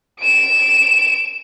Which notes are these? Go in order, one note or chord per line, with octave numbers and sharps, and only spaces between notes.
D7 E7